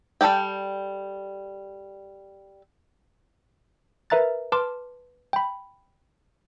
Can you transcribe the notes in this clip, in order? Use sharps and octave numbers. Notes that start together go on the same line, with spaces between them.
G3 A4 C5 D5 G5
A#4 B4 E5 A#5 F#6 A6
B4 A5 C6 D6 F6
G5 B5